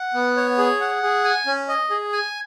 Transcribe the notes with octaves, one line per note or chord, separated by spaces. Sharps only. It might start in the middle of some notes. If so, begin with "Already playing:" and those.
Already playing: F#5
B3
C#5
G#4
F#5
G#4
G#5
C#4
D#5
G#4
G#5